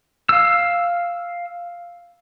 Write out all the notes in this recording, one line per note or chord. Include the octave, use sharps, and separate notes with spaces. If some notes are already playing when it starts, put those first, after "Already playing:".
F5 E6